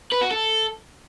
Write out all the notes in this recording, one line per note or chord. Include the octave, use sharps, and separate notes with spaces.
B4
F#4
A4